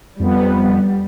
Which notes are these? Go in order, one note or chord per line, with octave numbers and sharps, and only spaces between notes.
F2 G3 B3